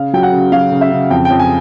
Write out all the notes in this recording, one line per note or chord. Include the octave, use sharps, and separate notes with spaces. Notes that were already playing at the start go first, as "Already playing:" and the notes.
Already playing: C#3 F5
F#3 G5
F#5
C#3
F#3 F5
C#3
E5
C#3
F2 G5
G5
F2
G#5